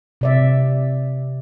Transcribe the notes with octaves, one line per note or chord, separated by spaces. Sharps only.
C3 D5 E5